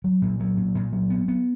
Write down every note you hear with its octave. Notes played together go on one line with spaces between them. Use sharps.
F#3
A#2
F#3
A#2
A#2
F#3
B3
B3